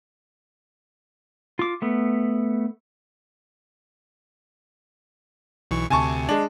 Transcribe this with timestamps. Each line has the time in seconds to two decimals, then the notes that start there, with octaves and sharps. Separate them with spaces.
1.59 F4 D6
1.82 A3 B3
5.71 B1 E3 C#6
5.90 D2 C3 G#5 A5 C#6
6.29 G#3 D4